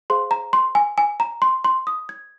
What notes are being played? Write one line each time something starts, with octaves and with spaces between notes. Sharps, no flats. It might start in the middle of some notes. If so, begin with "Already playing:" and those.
G#4 C5 F5 C6
A#5
C6
G#5
G#5
A#5
C6
C6
D#6
G#6